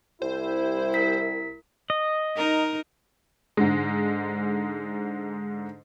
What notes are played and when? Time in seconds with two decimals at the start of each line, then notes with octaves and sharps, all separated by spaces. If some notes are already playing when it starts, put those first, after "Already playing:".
0.22 C2 G3 E4 C5
0.94 A#4 B6
1.90 D#5
2.36 D#4 A#4
3.57 G#2 D3 G#3